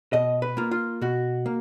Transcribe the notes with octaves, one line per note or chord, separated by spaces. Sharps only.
B2 D#5
B4
A#3 F4
F4
B2 F#4
A#3